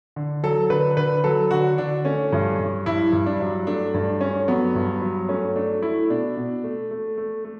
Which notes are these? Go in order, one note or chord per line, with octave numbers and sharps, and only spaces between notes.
D3
F#3 A4
D3 B4
D3 B4
F#3 A4
D3 F#4
D3 D4
A3 C#4
G2
G2
G2 E4
G2
D4
F#3
A3 D4
G2 D4
A3 C#4
F#3 B3
G2
F#3
A3 C#4
A3 D4
A3 E4
B2 D4
B2
A3
A3
A3
A3